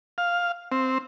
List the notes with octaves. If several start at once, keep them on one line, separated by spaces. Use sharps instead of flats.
F5
C4